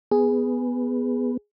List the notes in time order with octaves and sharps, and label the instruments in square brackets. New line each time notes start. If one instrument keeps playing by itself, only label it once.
[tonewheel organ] B3 [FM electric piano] G#4